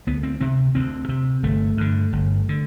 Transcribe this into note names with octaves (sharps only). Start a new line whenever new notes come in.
D2 B3
C4
C3 C4
D2 C4
C3
G1 A3
G2 D3
G1
D3